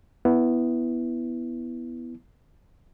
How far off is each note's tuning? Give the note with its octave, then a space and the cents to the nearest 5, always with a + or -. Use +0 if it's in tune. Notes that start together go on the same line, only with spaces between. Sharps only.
B3 +0 E4 +0